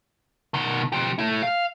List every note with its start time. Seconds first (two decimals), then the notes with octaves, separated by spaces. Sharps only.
0.54 B2 D#3
0.92 F3 G4
1.18 A3 E4
1.43 F5